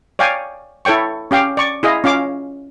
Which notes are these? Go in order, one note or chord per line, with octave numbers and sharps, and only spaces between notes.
C#5 D5 F5 G5 G#5
E4 A4 C#5 G5 C#6
C#4 G4 F5 G5
D5 C#6
E4 G#4 D#5 F5
C#4 F4 F5 D6